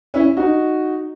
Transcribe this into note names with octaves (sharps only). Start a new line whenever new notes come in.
C#4 E4
D#4 F#4